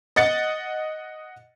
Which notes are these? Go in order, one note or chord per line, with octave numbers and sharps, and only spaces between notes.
D#5 F#5 A6 C#7